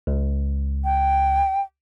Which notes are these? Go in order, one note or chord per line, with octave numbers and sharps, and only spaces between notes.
C#2
G5